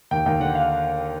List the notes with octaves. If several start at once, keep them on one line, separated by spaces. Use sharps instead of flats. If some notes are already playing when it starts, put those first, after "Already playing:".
D#2 G5
D#2 G5
D3 F#5
F5